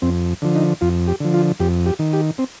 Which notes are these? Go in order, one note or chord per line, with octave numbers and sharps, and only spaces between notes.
F2 C4
D3 F3
D#4
F2 F4
G4
D3 F3
F4
F2 G4
G4
D#3
G4
C4